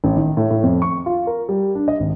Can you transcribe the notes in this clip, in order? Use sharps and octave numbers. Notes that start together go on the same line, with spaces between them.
A1
D#3
A2
A2
F2
C#6
F4
A#4
G3
D4
D#5
G#1